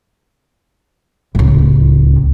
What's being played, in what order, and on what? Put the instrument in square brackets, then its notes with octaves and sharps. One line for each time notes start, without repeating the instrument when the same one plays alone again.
[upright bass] D1 C#2